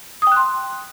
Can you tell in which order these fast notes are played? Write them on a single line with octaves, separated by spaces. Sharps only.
D#6 G5 F#6 C6